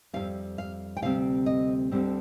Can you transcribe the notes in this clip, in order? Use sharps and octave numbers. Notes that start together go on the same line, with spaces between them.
F2 C3 G3 F5
F5
G5
D2 C3 G3 C4 F5
D#5
D2 D3 G3 C4